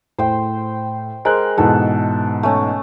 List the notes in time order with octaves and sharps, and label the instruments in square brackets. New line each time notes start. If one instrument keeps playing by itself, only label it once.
[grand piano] A2 [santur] C5 G5
[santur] G#3 [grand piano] A#4 C5 F#6
[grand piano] G#2 B2 E3 [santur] A4
[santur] A3 C#4